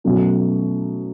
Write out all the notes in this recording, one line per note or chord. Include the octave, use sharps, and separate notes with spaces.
B2 F#3 A3 C#4